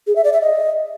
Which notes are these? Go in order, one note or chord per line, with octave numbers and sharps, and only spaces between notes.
G#4
E5
D5
E5
D#5